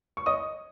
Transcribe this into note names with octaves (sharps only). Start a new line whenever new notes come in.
C#6
D#5 D#6